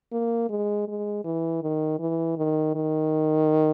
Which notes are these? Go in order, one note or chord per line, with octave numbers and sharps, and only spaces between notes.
A#3
G#3
G#3
E3
D#3
E3
D#3
D#3